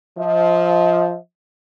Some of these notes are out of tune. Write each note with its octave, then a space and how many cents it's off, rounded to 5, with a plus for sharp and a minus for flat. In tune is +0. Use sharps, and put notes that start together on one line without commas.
F3 +0 D#5 +40